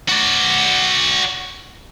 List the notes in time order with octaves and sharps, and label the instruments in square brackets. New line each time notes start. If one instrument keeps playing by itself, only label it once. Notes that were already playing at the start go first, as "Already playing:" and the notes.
[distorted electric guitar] F#4 D5